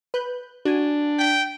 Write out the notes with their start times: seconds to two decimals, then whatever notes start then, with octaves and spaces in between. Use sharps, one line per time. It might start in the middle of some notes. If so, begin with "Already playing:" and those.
0.14 B4 F#6 G6
0.65 D4 F#4 G#5
1.19 G5 B6